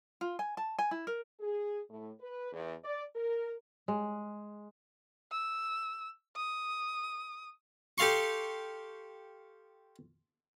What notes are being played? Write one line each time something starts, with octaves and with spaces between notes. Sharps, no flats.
F4
G#5
A5
G#5
E4
A#4
G#4
A2
B4
E2
D5
A#4
G#3
E6
D#6
G4 A4 F5 C6 C#6